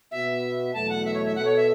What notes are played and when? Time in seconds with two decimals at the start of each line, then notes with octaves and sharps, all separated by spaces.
0.11 B2 B3 F#4 E5
0.73 E2 B2 F#3 A3 A5
0.89 F#5
1.05 E5
1.14 C#5
1.26 E5
1.35 B2 B3 A4 F#5
1.45 C#5
1.56 E5